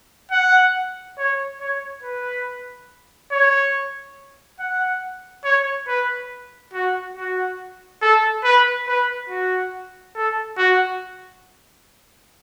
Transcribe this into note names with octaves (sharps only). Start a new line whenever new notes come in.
F#5
C#5
C#5
B4
C#5
F#5
C#5
B4
F#4
F#4
A4
B4
B4
F#4
A4
F#4